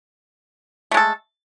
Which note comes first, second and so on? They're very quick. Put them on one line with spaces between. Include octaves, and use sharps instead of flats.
A3 G#3 A4